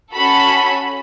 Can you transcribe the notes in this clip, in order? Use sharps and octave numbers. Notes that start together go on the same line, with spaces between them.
C#4 F#4 A4 B5